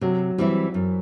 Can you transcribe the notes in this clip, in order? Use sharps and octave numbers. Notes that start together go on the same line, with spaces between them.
C3 F#3
E3 G3 C4 E4
F#2